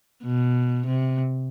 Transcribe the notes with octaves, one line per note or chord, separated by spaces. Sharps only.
B2
C3